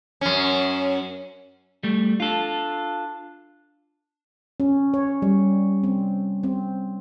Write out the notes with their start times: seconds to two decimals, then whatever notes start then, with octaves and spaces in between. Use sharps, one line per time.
0.21 F#2 C#4
1.83 G3 A3
2.20 D4 F4 A4
4.60 C#4
4.94 C#5
5.22 G3
5.84 C4
6.43 C4